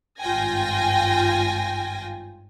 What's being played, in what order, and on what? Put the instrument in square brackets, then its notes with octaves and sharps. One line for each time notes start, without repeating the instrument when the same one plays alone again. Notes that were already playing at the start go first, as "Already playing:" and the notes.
[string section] G#1 G2 F4 G5 G#5 A#6